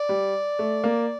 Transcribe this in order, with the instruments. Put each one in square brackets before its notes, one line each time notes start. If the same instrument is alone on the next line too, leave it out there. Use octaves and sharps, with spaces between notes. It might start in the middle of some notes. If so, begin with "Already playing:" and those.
Already playing: [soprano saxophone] D5
[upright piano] G3
A3
A#3